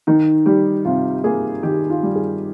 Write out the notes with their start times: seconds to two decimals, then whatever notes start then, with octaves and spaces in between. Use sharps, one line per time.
0.07 D#3 D#4
0.46 G3 G4
0.85 C3 F4
1.24 A#3 G#4
1.63 D#3 G4
1.90 F4
2.03 G3
2.15 G#4